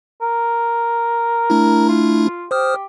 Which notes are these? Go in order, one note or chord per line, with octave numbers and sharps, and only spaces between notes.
A#4
A3 D4 E4
F4
G4 C5 D#6 F6